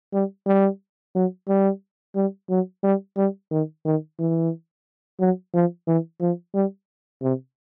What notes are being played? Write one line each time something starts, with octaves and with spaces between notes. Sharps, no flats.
G3
G3
F#3
G3
G3
F#3
G3
G3
D#3
D#3
E3
F#3
F3
E3
F3
G3
C3